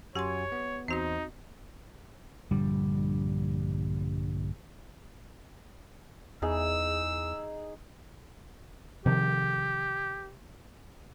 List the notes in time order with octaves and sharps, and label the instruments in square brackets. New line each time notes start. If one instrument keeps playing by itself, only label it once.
[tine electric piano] F#2 F#4 G#5 [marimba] G4 C6 [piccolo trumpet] C#5
[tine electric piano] B3
[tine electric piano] E2 C5 [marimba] C4 F#4 D#5 [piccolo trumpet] D#4
[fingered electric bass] A#1 G2 D3 G3
[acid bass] E2 [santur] D#4 G#4 [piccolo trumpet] E6
[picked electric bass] C3 D#3 F3 [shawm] G4